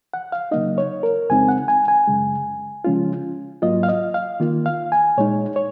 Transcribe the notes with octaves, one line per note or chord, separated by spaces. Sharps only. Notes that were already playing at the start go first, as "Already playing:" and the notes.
F#5
F5
C#3 F#3 A#3 D#4 D#5
C#5
A#4
F2 C#3 G#3 C4 D#4 G#5
F#5
G#5
G#5
F#2 C#3 G#3
C#3 F3 G#3 C#4 F4
G#2 F#3 A#3 F4 D#5
F5
D#5
F5
D#3 A#3 F4
F5
G#5
A#2 G#3 D#4 C#5
C#5